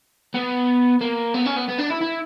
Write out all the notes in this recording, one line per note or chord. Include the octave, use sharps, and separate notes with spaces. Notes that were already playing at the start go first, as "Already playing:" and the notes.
B3
A#3
B3
C#4
B3
B3
D4
E4
E4